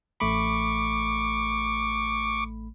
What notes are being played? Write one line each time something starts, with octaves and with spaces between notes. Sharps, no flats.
A1 A3 B5 C#6 D6